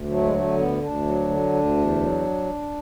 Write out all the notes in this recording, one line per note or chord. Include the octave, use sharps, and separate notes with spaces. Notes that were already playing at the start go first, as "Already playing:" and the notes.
Already playing: D2
F#3 A3
G#3
D3 A3
D2 B3
D2 D4
F#3
D3
D2
E2
F#3